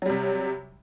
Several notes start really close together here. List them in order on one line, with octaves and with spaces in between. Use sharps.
F#3 G3 C3